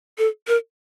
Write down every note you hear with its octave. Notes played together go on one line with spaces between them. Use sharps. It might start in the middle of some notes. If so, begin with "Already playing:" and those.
A4
A#4